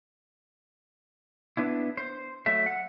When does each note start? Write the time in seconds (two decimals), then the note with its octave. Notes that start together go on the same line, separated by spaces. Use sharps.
1.57 B3 D4 E4
1.97 C5
2.46 F#3 A3 E5
2.66 F#5